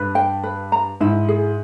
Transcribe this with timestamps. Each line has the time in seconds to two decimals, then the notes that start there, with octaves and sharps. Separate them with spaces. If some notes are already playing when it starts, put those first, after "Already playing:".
Already playing: G2 B4
0.15 G5
0.43 B4
0.72 A#5
1.01 G#2 E4
1.28 G#4